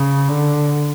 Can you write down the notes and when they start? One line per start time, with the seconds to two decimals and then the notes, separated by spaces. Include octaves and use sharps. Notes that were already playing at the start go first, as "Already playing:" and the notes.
Already playing: C#3
0.29 D3